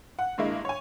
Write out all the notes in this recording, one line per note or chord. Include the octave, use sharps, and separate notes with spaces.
F#5
G2 G#3 A#3 E4
C#5 G#5